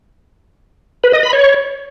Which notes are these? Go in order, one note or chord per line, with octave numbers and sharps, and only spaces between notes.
B4
D#5
B5
C#5